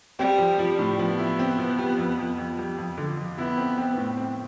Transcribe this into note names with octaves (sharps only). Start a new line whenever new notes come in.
G3 C4
F3
F3
A2
F3 B3
E4
C4
F3
G3
F2
F2
F2
G3
F2
D3
F2
B3 E4
C4
C4
A2
C4